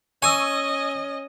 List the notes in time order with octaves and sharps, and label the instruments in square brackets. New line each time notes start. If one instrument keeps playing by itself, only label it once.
[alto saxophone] C#4 [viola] D#5 [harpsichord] G#5 [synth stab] C#6 E6